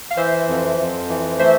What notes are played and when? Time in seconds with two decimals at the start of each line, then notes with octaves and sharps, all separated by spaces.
0.11 F5
0.17 E3 C5 E5
0.47 F2
0.78 F2
1.09 E3
1.39 A3 C5 E5